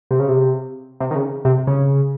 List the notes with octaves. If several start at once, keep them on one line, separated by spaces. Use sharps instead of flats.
C3
C#3
C3
C3
D#3
C#3
C3
C#3